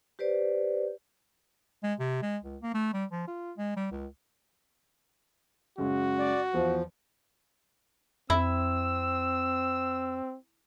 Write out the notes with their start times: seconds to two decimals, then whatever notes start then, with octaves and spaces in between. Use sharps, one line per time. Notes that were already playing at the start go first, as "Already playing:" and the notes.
0.19 G4 B4 C5 D5
1.83 G#3
1.99 C3
2.22 G#3
2.44 C#2
2.62 A#3
2.74 A3
2.94 G3
3.12 F3
3.28 F4
3.57 G#3
3.76 G3
3.91 C#2
5.78 F#2 C#3 G#3 F#4
6.19 D5
6.54 E2 F3
8.30 F2 C4 E4 E6